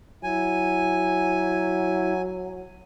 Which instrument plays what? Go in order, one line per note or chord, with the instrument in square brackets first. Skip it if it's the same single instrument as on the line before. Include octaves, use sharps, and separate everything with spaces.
[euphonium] F#3 [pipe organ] E4 [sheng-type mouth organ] G#5